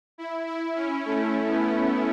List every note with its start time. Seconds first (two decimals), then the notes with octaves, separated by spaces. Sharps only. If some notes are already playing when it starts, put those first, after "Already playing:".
0.18 E4
0.46 E4
0.76 C#4
1.05 A3
1.48 B3